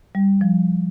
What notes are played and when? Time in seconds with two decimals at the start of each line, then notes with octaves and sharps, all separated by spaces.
0.15 G3
0.41 F3